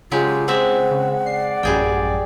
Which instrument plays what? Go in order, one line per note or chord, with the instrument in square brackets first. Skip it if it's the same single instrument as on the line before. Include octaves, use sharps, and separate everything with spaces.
[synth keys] C#3 [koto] F#3 G#3 G4 [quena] F4
[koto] G#3 C4 E5 [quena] F#5
[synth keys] C#3
[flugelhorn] D5 [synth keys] C7
[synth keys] A1 F#2 [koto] G3 G#4 G5